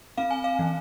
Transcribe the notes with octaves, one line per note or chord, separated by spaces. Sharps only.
C4 F5
G#5
F5
E3